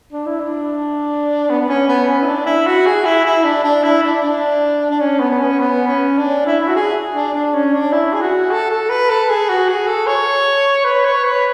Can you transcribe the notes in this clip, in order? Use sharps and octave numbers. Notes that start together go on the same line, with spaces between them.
D4
E4
D4
B3
B3
C#4
B3
C#4
E4
D4
E4
F#4
G#4
E4
E4
D4
D4
E4
D4
D4
D4
C#4
B3
B3
C#4
B3
C#4
D4
E4
E4
F#4
G#4
D4
D4
C#4
D4
E4
G#4
F#4
A4
A4
B4
A4
G#4
F#4
G#4
A4
C#5
B4
C#5
B4